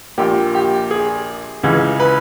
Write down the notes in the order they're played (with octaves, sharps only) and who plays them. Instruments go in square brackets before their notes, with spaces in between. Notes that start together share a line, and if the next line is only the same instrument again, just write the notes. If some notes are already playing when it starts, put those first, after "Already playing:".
[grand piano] A#1 A#2 G4
G4
G#4
C#2 C#3 E3
B4